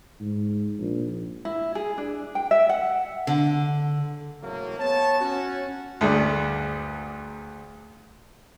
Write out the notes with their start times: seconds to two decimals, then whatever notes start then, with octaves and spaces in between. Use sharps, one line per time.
0.20 G#2
0.79 A#1
1.45 E4
1.75 G#4
1.98 D4
2.35 G5
2.51 E5
2.69 F#5
3.27 D3
4.42 E2 A2 C#3 F#3 A3 A#3
4.79 B3 C#5 A5
5.20 C#4 F#4
6.01 D2 G2 D4 G#4